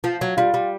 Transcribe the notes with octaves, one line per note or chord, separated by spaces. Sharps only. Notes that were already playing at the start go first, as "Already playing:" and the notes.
F3
F#3
G3 F4
G3